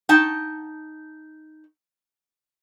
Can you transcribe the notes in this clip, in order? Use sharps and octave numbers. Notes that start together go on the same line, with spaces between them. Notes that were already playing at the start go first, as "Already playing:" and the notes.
D#4 G5 A5